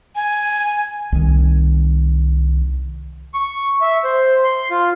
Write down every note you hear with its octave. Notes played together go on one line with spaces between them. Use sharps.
G#5
C2 D#3
C#6
E5
C5
C6
F4